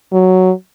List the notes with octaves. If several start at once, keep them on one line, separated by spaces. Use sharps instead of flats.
F#3